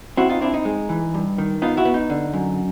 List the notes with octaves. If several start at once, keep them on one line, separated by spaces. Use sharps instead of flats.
C4 E4 F#4
D#4 F4
C4 D4 E4
D#4
G#3
E3
G2
D#3
B3 D#4 F4
E4 F#4
B3
D#4
D3
F#2